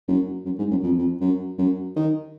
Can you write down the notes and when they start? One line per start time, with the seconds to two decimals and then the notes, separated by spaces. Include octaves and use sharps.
0.08 F#2
0.45 F#2
0.58 G#2
0.70 F#2
0.83 F2
0.98 F2
1.20 F#2
1.58 F#2
1.96 D#3